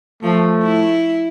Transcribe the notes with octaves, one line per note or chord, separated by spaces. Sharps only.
F3 A3
E4